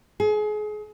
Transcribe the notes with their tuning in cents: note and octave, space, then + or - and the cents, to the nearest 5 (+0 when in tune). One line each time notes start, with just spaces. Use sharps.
G#4 +30